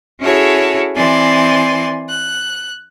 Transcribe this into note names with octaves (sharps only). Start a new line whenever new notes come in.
C#4 E4 F#4 G#4 A4 C#5
E3 C4 D5 G#5 C6
F#6